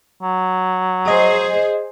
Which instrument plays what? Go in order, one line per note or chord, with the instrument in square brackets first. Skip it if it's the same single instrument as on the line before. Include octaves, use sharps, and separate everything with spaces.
[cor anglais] F#3
[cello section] G#4 C5 [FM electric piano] D#5